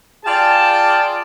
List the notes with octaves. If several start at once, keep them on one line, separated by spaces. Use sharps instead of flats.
F4 G#4 D5 G5 A5